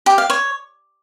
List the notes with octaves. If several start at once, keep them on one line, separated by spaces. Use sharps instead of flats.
G4
F5
C#5